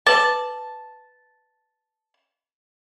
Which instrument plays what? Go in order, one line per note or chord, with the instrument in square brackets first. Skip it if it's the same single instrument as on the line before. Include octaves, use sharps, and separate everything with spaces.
[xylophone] B4 D6 [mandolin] A5